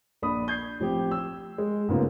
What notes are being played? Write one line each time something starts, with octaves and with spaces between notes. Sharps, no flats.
A#1 D4 B5 D#6
G6 G#6 C7
A1 F3 C4 G4
E6
G#3
A1 G#2 C#3 A#3 B3 F4